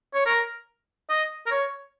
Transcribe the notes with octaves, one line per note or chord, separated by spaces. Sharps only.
C#5
A#4
D#5
A#4
C#5